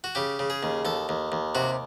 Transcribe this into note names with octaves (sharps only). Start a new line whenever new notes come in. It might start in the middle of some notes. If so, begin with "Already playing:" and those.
F#4
C#3 G4
C#3
G#4
D#2
D#2 A4
D#2
D#2
C3 F#4